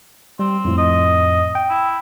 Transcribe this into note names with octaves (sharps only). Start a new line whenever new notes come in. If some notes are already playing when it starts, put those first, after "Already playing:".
G3 C4
F2 A2
D#5
G5
E4